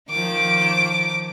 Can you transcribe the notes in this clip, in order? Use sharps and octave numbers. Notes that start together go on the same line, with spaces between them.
D#3 F3 D6